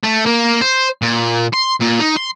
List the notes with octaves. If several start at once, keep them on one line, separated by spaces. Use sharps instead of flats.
A3
A#3
C5
A#2
C6
A#2
D#4
C6